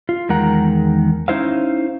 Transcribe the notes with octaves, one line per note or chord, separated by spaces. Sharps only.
F4
E2 D#3 G#3 A#4 F#5 A#5
C#4 D#4 E4 C5 E5 F5